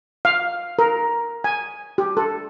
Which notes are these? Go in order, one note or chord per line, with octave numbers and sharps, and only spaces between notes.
F5
A#4
G#5
G4
A4